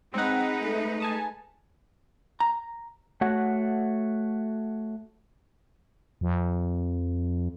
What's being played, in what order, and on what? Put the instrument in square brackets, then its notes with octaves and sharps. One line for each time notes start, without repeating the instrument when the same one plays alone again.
[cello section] G#3 D#4 B4 [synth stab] C4 F#5
[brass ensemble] A3
[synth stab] G#5 A5 D#6
[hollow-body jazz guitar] A#5
[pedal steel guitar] A3 F#4 C#5 F#5
[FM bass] F2